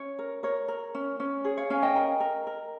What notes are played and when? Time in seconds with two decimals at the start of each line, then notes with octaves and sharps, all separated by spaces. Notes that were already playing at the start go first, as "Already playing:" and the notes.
Already playing: C#4 C#5
0.19 A#4
0.43 A#4 C#5
0.68 A#4
0.95 C#4
1.20 C#4
1.45 G#4 C#5
1.57 C#5 F5
1.70 C#4 F5 G#5
1.82 D#5 G5
1.96 A#4
2.20 A#4
2.47 A#4